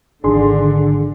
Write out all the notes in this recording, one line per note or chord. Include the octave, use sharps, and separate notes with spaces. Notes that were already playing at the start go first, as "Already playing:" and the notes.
G#1 D3 D#3 D4 G#4 C6